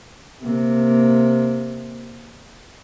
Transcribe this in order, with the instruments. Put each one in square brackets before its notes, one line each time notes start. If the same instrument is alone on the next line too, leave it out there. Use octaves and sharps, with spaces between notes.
[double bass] C3 A#3